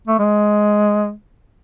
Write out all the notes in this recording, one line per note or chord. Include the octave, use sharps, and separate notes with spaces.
A3
G#3